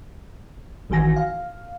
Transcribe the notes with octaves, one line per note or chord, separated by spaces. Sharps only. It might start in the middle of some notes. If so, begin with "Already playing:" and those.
A1 D#3 E3 F#4 G#5 A#6
F5